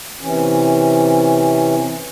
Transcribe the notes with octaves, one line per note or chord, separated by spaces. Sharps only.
C3 E3 C#4